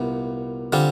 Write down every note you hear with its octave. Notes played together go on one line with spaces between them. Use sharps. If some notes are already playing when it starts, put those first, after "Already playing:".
Already playing: C2 A#2 B3
D3 G3 C4 F4